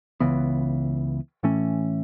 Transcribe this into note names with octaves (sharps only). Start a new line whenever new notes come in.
C#2 C#3 E3 B3
A2 E3 A3 C#4